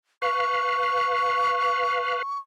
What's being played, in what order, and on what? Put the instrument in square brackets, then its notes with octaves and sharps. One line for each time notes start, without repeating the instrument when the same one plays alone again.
[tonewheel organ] B4 F5 [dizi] C#6